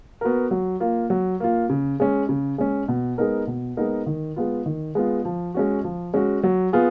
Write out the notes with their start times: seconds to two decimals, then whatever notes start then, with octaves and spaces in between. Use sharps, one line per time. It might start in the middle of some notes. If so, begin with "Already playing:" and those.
0.21 B3 F#4 A#4
0.51 F#3
0.80 A#3 F4
1.10 F#3
1.40 A#3 F4
1.70 C#3
2.00 G#3 C#4
2.29 C#3
2.58 G#3 C#4
2.88 B2
3.18 G#3 B3 D#4 A#4
3.47 B2
3.77 G#3 B3 D#4 A#4
4.06 D#3
4.36 G#3 B3 F4
4.66 D#3
4.95 G#3 B3 F4
5.25 F3
5.54 G#3 C#4 F#4
5.84 F3
6.14 G#3 C#4 F#4
6.43 F#3
6.73 B3 F4 G#4